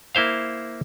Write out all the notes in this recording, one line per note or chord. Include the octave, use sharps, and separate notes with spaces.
A#3 E4 C5 F5